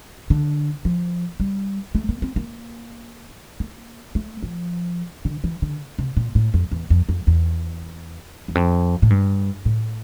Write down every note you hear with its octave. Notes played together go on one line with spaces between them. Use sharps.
D3
F3
G3
A3
A#3
C4
A#3
A#3
A3
F3
D3
E3
D3
C3
A#2
A2
F2
E2
F2
F2
E2
E2
F2
A2
G2
A2